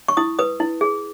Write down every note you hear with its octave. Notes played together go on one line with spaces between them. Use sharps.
C#6
E4 D#6
B4 D#6
E4
G#4